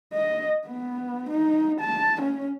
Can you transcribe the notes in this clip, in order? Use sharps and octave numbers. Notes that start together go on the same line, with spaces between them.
D#5
B3
D#4
A5
C#4